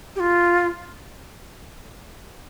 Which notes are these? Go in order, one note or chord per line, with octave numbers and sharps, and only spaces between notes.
G4
F4